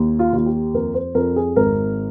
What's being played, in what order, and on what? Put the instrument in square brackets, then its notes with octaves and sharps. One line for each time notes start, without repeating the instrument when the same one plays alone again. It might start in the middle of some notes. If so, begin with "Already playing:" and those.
Already playing: [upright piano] D#2
F4
D#2 F4
G4
F2 A#4
C5
F2 A#4
G#4
G#1 A#4